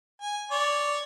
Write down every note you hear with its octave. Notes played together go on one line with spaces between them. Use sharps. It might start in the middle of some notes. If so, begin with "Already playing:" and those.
G#5
C#5 D5